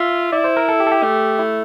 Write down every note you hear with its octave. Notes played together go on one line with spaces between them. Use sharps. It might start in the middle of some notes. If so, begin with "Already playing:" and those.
Already playing: F4 E5
E4 D5
C5
A#4
A4
G4
A4
G4
A3
E4